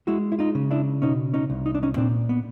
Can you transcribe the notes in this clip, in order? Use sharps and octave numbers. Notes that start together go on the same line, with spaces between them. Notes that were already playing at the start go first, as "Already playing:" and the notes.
G#3 E4 F#4
E4
D#4 F4
C#3
D4 E4
B2 C#4 D#4
C#4 D#4
C2
D#4
D4
C#4 D#4
A#2 C4 D4
B3